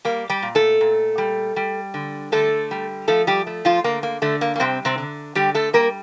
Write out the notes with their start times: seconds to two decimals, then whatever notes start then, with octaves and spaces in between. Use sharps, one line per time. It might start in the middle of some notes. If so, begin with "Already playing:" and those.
0.05 G3 A#3
0.30 G3 G4
0.43 A#2
0.55 A3 A4
0.81 A#2
1.18 G3
1.56 G3
1.94 D3
2.32 D3 A3 A4
2.71 G3
3.08 F3 A3 A4
3.27 G3 G4
3.47 A3
3.65 F3 F4
3.84 D3 A#3
4.03 A#3
4.22 D3 A3
4.41 A#3
4.56 A#3
4.60 C3 G3 C4
4.85 C3 C4
4.98 D3
5.35 D3 G3 G4
5.55 A3 A4
5.73 G3 A#3 A#4